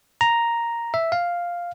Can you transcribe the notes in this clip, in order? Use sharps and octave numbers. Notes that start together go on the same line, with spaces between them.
A#5
E5
F5